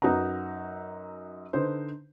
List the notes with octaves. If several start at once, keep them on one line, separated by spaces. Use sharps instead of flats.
F#2 D#4 F#4 B4 A#5
D3 D#4 B4 C5